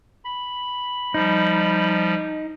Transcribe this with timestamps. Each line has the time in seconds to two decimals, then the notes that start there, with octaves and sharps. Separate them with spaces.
0.25 B5
1.14 F3 G3 D#4